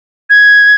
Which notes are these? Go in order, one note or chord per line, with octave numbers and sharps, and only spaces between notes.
G#6